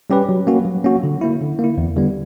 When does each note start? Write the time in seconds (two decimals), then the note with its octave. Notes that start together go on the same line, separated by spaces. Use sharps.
0.10 G3 C#4 G4 B4
0.29 F#3
0.47 A#3 C#4 F#4
0.65 F#3
0.84 A#3 C#4 F#4
1.03 D3
1.21 A#3 E4
1.41 D3
1.59 A#3
1.64 E4
1.78 E2
1.96 D3 G3 B3